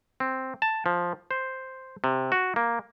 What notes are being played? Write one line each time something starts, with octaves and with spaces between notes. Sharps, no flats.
C4
A5
F3
C5
C3
F#4
A#3